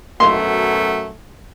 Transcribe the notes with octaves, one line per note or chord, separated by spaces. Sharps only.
F#2 B2 A3 C6